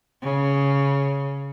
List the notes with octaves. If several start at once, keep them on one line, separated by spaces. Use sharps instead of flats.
C#3